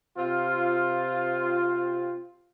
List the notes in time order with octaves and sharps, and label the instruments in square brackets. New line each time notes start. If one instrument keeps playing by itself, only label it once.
[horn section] C3 C4 F4